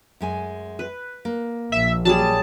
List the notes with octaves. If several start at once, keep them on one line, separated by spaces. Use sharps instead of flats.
F#2 G#3 G#5
B4
A#3
A#1 E5
F#3 G3 G#4 A5